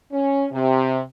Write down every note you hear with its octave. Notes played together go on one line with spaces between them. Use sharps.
C#4
C3